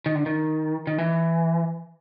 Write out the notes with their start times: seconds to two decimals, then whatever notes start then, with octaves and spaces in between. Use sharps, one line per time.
0.06 D#3
0.15 D3
0.26 D#3
0.87 D#3
0.98 E3